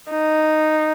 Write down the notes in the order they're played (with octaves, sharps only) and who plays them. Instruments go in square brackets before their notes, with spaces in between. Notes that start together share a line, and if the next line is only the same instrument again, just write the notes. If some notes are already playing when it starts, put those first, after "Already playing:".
[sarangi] D#4